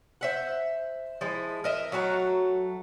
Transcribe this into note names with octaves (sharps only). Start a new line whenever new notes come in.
C5 E5 F#5
F3 G#3 E4
A#4 D#5 E5
F#3 A3 F#4 A#5